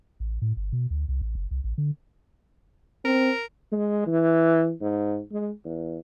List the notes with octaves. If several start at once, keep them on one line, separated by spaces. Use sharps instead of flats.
A1
A2
G1
B2
D2
C2
A1
F#1
C2
A1
D3
C4 A#4
G#3
E3
G#2
G#3
E2